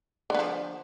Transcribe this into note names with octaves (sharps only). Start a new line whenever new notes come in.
D3 F3 B3